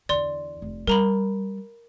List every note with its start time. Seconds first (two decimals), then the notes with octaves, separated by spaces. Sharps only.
0.09 E2 D3 D5 C6
0.62 F1
0.87 G3 A#4 A#5 B5